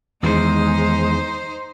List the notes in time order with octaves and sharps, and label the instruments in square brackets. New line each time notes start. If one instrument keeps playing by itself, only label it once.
[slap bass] E2 D#3 [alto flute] G#3 [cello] D#4 C5